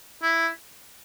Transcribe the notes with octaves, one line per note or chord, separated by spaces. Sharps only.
E4